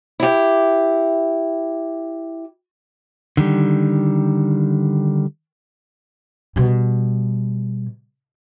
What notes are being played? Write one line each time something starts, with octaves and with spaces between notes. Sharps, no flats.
E4 G4
D3 D#3 G3
B2 G3